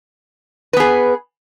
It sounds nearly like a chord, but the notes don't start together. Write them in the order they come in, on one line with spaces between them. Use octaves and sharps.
B4 B3 G#4